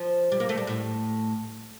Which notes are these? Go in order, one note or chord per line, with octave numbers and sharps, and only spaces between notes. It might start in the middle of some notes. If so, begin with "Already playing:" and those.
Already playing: F3
G3
A#3
A3
G3
A2